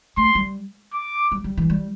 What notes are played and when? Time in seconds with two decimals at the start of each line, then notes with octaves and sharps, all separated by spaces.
0.17 A3 C6
0.35 G3
0.94 D6
1.32 G3
1.44 G3
1.57 E3
1.70 G3